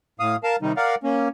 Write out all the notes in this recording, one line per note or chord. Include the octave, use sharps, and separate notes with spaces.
A2 F5 D#6
A#4 F5 A5
C3 D#3 G3 D#4
A#4 D5 F5 F#5
A#3 C#4